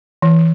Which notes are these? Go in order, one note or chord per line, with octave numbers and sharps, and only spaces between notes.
E3